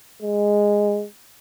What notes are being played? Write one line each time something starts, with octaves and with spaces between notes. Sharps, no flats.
G#3